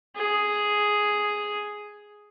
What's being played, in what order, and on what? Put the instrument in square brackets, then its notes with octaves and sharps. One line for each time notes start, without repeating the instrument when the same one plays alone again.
[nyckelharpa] G#4